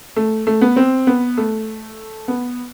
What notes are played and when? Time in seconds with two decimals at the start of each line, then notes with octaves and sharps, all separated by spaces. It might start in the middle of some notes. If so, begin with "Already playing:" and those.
0.16 A3
0.47 A3
0.61 B3
0.76 C4
1.07 B3
1.37 A3
2.28 B3